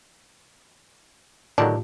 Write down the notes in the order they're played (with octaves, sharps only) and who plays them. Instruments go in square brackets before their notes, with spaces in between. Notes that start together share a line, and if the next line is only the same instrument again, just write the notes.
[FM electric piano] A2 F4 G4 [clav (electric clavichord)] D3 D#3 F#3 [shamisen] D4